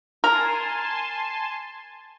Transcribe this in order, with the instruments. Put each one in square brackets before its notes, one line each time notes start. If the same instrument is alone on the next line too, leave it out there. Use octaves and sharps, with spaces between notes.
[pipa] A#4 [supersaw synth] G#5 A5 C6